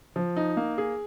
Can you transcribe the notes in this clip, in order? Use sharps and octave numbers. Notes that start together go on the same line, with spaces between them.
F3
D#4
A#3
G#4